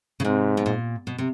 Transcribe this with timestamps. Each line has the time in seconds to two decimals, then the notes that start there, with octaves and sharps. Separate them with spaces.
0.20 C#3
0.24 G#2 C3
0.57 B2
0.66 A#2
1.07 B2
1.18 C3